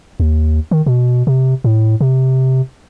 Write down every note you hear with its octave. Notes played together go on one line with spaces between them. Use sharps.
D#2
D#3
B2
C3
A2
C3